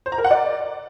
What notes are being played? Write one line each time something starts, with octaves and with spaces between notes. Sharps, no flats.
C5
A#5
A#4
F#5
D5